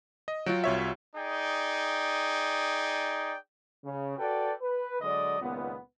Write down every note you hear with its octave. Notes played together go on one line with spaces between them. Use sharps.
D#5
F#3 F4 F#4 G5
C2 C#5 E5
D#4 G#4 D5 G5
C#3
F#4 A4 B4 D5 G5
B4
D3 F#3 G#3 D5 D#5
C#2 A#2 D#3 B3